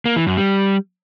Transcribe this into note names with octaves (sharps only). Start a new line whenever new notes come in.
A#3
E3
F#2
G3